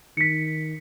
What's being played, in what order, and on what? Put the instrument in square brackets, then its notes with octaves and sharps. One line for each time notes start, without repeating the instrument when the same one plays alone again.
[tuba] D#3 [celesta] B6 C#7